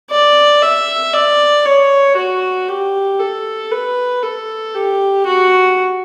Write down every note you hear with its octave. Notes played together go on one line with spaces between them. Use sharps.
D5
E5
D5
C#5
F#4
G4
A4
B4
A4
G4
F#4